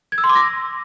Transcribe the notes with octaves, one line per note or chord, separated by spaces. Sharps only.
G#6
E6
C6
D6
A#6